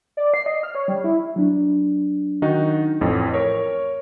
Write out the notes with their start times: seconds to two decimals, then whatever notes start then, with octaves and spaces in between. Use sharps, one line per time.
0.17 D5
0.34 C7
0.46 D#5
0.63 F6
0.75 C#5
0.88 G3
1.04 E4
1.36 F#3 D4
2.42 D#3 D#4 F#4
3.01 A1 F2
3.34 A#4 C#5